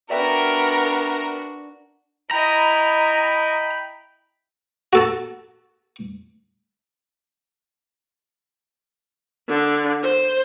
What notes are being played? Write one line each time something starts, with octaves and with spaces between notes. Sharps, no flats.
B3 D4 F#4 A#4 D5 E5 G5
E4 D#5 G5 A#5 B5
F#4 A4 A5
D3
C5